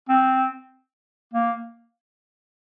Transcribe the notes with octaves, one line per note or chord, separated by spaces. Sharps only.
C4
A#3